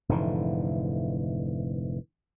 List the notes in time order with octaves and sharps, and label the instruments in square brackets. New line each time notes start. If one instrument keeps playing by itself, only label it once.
[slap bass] F1 G#2 D3 E3